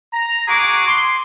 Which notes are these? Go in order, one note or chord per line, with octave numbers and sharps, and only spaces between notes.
A#5
F#4 G#4 D6
C6